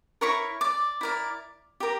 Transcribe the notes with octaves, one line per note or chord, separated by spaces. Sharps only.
E4 A#4 C#5 C#6
D5 D6
E4 A#4 D5
G4 A#4